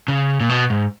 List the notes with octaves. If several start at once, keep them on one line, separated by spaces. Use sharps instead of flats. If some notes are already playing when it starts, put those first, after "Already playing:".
C#3
A#2
B2
G#2